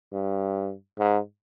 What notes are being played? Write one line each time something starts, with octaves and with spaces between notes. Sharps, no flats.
G2
G#2